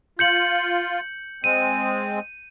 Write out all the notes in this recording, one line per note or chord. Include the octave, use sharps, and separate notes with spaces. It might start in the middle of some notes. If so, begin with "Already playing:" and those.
F4 G6 C#7 F#7
G#3 C4 D#7